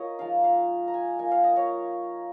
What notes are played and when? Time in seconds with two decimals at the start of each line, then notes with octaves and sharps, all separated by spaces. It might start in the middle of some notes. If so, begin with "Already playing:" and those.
Already playing: F4 A#4 C#5 D#5
0.19 F3 G#3 D#4 F5
0.44 F5
0.88 A#5
0.94 G#5
1.18 F3 A#3 D#4 G#5
1.31 F5
1.44 D#5
1.56 C#5